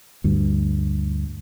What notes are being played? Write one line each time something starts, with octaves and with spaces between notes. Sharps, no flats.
D2 G2